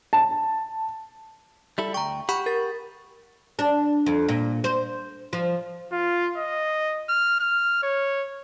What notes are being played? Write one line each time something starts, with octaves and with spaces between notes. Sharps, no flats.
A5
G3 E4 A4
D2 G5 A#5 C#6
G4 F#5 B5 C#6
A#4 A6
D4
F2
A#2
C5
F3
F4
D#5
F6
F6
C#5